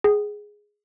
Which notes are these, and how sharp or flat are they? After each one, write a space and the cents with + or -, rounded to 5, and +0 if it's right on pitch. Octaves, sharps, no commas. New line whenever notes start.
G#4 +0 G5 -40